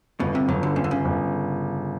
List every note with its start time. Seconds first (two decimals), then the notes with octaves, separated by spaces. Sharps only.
0.20 G1 B2
0.35 C3
0.48 G1 F#3
0.63 D3
0.76 G1 C#3
0.84 D3
0.91 C#3
1.05 G1